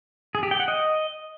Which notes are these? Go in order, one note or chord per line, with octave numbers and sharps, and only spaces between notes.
G#4
G4
G5
F#5
D#5